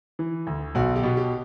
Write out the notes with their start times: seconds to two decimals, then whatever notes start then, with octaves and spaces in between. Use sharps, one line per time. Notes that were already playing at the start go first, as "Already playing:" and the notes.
0.19 E3
0.47 D2
0.75 B1 F#4
0.96 G4
1.03 B2
1.17 G4